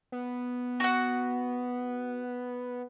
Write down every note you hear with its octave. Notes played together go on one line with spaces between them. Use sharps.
B3
F#4 F#5